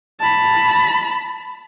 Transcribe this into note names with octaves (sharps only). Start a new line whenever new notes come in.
A5 B5